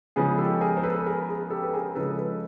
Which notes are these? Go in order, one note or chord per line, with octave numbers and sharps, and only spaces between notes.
C#3 F3 G#3 B3 G#4
G4 A4
G#4 A#4
C5
A4 B4
G#4 A#4
G#4
G4 A4
B4
G#4 A#4
C#3 F3 G#3 A4 B4
A4 B4